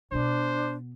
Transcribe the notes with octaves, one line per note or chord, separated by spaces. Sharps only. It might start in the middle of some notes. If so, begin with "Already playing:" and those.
B2 B3 D4 C5